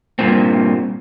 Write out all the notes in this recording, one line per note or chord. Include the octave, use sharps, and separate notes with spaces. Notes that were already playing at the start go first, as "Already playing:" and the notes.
G2 A#2 C4